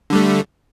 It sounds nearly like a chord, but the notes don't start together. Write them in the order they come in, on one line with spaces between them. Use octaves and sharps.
D3 G3 A3